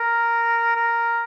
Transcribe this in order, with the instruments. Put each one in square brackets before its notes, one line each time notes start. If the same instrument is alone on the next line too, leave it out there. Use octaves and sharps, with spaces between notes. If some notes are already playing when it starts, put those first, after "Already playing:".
Already playing: [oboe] A#4
A#4